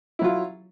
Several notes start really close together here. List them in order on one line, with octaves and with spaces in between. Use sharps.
E4 F#3 F4